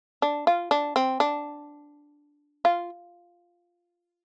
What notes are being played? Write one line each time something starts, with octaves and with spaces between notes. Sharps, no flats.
D4
F4
D4
C4
D4
F4